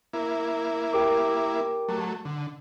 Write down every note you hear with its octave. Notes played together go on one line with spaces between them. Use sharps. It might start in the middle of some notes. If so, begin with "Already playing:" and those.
A#3 E4
G4 A#4 D6
F#3 A3
D3